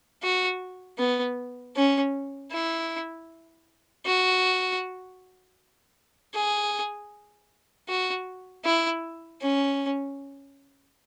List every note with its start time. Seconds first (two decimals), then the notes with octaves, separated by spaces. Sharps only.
0.23 F#4
0.98 B3
1.76 C#4
2.52 E4
4.05 F#4
6.34 G#4
7.88 F#4
8.65 E4
9.41 C#4